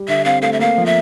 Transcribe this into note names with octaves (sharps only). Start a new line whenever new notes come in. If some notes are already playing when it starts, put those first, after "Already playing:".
Already playing: G3
D3 E5
C4 F5
A3 F5
E5
A#3 F5
F3
E5